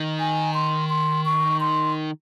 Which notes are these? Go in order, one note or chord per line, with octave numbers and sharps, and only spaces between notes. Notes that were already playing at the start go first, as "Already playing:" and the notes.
Already playing: D#3
G#5
C6
C6
C#6
C6